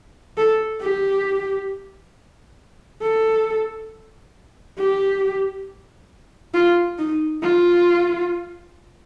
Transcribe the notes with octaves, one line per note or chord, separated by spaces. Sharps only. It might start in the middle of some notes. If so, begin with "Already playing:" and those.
A4
G4
A4
G4
F4
D#4
F4